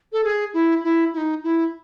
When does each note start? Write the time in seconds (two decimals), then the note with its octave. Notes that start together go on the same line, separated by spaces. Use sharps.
0.13 A4
0.24 G#4
0.54 E4
0.84 E4
1.14 E4
1.17 D#4
1.44 E4